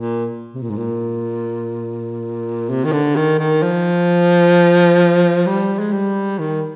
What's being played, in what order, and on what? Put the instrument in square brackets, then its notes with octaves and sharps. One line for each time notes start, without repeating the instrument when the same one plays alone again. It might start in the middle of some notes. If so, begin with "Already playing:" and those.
Already playing: [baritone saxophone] A#2
C3
A#2
G#2
A#2
C3
D#3
D3
D#3
D#3
F3
G3
G#3
G3
D#3